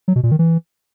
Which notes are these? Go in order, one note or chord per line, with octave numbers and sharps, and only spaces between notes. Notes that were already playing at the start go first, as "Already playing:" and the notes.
F#3
B2
A#2
D#3
E3